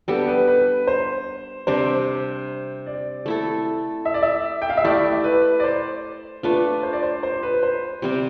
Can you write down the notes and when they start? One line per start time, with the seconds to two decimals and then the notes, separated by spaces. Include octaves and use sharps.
0.08 G3 B3 D4 G4 A4
0.28 B4
0.48 B4
0.87 C5
1.67 C3 G3 D4 C5
2.86 D5
3.26 A3 E4 A4
4.05 E5
4.14 D5
4.22 E5
4.62 G5
4.70 F5
4.77 E5
4.84 A3 E4 G4 D5
5.24 B4
5.60 D5
5.64 C5
6.43 A3 D4 F4 B4
6.83 C5
6.93 D5
7.03 C5
7.23 C5
7.43 B4
7.63 C5
8.02 C3 G3 C4